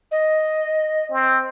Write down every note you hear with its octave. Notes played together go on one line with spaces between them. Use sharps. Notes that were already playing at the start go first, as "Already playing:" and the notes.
D#5
C4